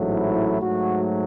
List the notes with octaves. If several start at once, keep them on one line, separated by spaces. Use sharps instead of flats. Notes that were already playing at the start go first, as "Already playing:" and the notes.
Already playing: A1 G#2 F#3 A3
E4
G#2 F#3 A3 F#4